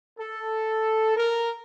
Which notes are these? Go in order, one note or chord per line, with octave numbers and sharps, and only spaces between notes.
A4
A#4